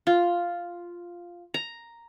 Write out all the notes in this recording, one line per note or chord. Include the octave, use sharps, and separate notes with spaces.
F4
A#5